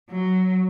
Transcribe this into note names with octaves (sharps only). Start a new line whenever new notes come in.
F#3